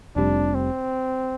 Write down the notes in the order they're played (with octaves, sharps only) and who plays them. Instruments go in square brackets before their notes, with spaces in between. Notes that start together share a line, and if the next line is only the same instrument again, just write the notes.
[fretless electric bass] F1 F2 C3 G3 [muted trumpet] D4
[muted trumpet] C4